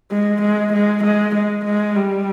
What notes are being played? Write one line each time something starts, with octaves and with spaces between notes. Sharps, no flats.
G#3
G#3
G#3
G#3
G#3
G#3
G3